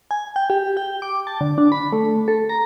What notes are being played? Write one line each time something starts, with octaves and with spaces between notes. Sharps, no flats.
G#5
G5
G4
G5
D6
A5
D3
D4
B5
A3
A4
A#5